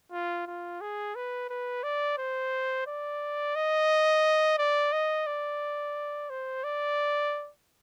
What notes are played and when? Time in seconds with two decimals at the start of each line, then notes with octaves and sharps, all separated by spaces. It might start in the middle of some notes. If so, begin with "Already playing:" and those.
0.11 F4
0.47 F4
0.81 G#4
1.15 B4
1.50 B4
1.83 D5
2.18 C5
2.87 D5
3.55 D#5
4.58 D5
4.92 D#5
5.27 D5
6.30 C5
6.64 D5